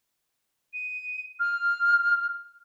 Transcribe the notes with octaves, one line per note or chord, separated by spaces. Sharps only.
D#7
F6